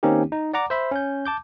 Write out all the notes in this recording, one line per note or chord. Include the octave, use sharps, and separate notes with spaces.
D#3 A#3 C4 C#4 D#4 G4
D#4
D5 F#5 A#5 D6
C5 E5 B5
C#4 G6
A5 D6 G6